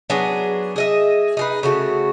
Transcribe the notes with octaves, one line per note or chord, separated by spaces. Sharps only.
F#3 B3 D4 G#4
G#4 D#5 E5
D#4 G#4 B4
C#3 A3 F#4